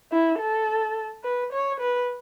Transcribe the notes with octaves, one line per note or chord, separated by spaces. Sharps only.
E4
A4
B4
C#5
B4